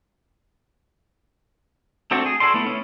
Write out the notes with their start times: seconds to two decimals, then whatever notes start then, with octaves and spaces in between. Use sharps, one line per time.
2.11 A3 C4 D4 F#4 A4
2.26 G#4
2.40 E4 F#4 A4 D5 C6
2.54 A3 B3 E4
2.67 C#4 E4